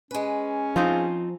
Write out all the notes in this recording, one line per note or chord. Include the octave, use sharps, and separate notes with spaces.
G#3 C#4 B4
F3 C4 D#4 F4